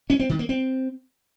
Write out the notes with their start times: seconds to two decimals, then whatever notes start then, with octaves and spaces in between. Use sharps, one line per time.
0.10 C#4
0.20 C4
0.29 D#3
0.39 A#3
0.49 C4